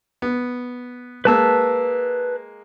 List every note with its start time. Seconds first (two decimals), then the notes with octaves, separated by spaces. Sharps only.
0.22 B3
1.25 G#3 A#3 B4 A5 E6